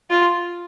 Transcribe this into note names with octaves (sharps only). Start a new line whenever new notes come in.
F4